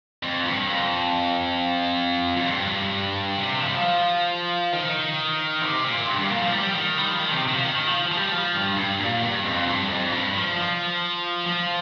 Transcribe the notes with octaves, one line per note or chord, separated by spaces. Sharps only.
F2
G2
F2
F2
G2
C3
F3
G3
F3
D#3
C3
A#2
G2
G2
A#2
F3
G3
D#3
G3
F3
D#3
C3
D#3
F3
D#3
D#3
F3
F3
G3
F3
G2
G2
A#2
G2
F2
G2
F2
G2
F3
F3
F3